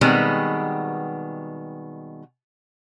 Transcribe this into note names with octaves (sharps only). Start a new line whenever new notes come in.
B2 D#3 G3 G#3 B3 C4